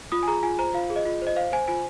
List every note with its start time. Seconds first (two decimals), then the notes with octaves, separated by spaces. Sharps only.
0.12 F4 D#6
0.23 G#5
0.28 G#4 A#5
0.43 F4 G#5
0.59 C5 A#5
0.74 F4 F5
0.90 G#4
0.96 D#5
1.05 F4
1.22 C5 D#5
1.36 C5 F5
1.52 C5 G#5
1.68 F4 G#5